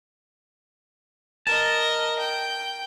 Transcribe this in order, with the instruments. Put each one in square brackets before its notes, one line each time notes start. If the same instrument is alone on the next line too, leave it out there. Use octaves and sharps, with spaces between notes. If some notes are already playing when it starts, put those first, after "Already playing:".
[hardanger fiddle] A#4 D#5 [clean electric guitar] A5
[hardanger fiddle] G5